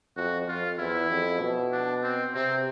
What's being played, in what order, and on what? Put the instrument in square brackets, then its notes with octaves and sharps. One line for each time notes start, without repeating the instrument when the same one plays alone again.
[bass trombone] F2 [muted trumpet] F#4
[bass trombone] F2 [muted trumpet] F4
[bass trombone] E2 [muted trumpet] E4
[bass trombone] F2
B2
[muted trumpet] D4
C4
[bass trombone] C3 [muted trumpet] C4